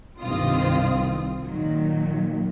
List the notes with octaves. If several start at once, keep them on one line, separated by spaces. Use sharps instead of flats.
C2 G2 D#3 C4 F4 D#6
A#2 D#3 F#3